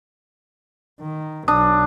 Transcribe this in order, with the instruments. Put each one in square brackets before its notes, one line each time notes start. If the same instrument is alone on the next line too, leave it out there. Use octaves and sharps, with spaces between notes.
[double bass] D#3
[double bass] B1 [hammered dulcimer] D4 [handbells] D#6